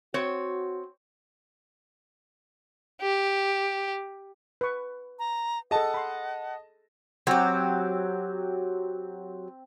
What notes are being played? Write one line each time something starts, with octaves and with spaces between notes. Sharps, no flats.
C4 F#4 C#5
G4
B4 C#6
A#5
G#4 A4 D#5 F#5 A5
B5 C6
F#3 C4 G4